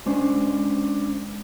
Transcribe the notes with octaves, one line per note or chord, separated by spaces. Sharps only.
G#3 C#4 D4 C5